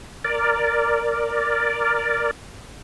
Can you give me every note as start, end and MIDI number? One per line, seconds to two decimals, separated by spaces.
0.25 2.31 70
0.25 2.31 74